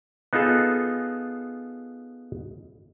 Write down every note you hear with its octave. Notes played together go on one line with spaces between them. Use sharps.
B3 D#4 F4 G#4 A4